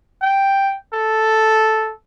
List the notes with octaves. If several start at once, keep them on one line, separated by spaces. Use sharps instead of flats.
G5
A4